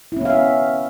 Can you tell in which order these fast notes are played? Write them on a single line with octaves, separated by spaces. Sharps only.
E4 C#4 B3 F5 E5